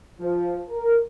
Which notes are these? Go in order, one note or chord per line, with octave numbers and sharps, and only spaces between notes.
F3
A#4